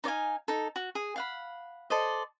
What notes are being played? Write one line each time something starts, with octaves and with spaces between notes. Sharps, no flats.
D#4 D5 F5 G#5
D#4 A4
F#4
G#4
F5 F#5 B5
A4 C5 D5 D#5